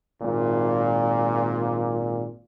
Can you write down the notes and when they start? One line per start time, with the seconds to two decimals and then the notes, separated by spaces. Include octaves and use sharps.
0.21 G#1 A#2